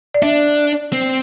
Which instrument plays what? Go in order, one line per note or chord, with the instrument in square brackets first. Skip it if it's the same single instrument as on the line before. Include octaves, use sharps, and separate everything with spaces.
[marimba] D5
[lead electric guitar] D4 [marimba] E5
[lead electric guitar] C4